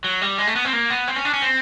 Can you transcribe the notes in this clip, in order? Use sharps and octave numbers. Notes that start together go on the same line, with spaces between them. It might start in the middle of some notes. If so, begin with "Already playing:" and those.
F#3
G3
G#3
A3
B3
C4
A#3
B3
C4
C#4
D4
C#4
C4